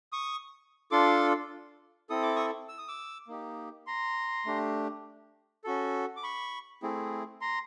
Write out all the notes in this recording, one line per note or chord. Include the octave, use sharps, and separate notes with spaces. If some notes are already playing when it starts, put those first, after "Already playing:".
C#6 D#6
D4 F4 A4 C6 D6
C4 E4 A4 D#6
D6
C#6 D#6
E6
D#6
D6 E6
A#3 D#4 G4
A#5 C6
A3 D4 G4
C#4 F#4 A4
D6
B5 C#6
A3 C4 E4 G#4
A#5 C6